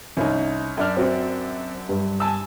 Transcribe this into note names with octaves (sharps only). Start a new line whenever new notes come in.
C2 C#4 D#4
F#2 D4 F6
C4 F#4 C5
G2
G#5 A5 E6